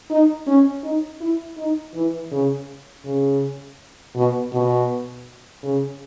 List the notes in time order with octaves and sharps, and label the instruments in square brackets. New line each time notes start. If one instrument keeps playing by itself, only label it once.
[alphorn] D#4
C#4
D#4
E4
D#4
E3
C#3
C#3
B2
B2
C#3